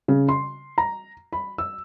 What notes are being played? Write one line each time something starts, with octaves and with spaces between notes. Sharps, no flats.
C#3
C6
A#5
B5
E6